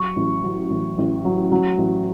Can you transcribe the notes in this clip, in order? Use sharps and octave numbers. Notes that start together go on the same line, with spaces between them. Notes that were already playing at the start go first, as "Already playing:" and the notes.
Already playing: F#3 C#6
A1
F#3
A1
A1
F#3
F#3
A1